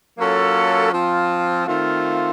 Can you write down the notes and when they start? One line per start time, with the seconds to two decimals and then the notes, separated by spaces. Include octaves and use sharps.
0.18 F#3 A#3 C#4 F4 A4
0.93 F3 C4 F4
1.67 D#3 A3 C4 F4